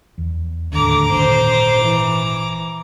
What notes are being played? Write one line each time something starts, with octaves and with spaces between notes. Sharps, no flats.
E2
D#2 A2 D3 A#5 D6
G#1 A#2 D#3 C5
E3